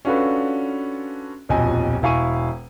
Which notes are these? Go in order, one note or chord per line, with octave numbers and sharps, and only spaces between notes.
C#4 D4 F4 F#4 A4 B4
D#1 B1 F2 D#5 G#5
E1 E4 F5 G#5 C#6 D#7